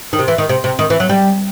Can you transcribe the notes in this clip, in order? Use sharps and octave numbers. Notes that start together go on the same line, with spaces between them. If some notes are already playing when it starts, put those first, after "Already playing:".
D#3
C3
E3
D#3
C3
C3
D#3
E3
F#3
G3